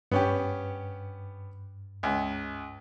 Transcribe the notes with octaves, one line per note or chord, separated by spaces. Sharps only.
G2 B3 C#4 G4
C#2